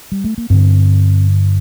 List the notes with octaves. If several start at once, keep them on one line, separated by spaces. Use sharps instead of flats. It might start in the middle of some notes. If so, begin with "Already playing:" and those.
G3
A3
A#3
G2 D3 C4